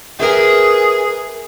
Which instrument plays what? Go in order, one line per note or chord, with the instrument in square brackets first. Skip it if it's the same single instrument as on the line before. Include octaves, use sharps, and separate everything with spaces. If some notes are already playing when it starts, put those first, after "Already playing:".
[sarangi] G#4 [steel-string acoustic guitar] A#4 B4 E5